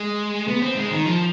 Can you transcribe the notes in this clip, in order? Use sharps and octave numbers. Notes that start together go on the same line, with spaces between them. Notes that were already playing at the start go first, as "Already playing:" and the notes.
Already playing: G#3
B3
C4
G#3
D#3
F3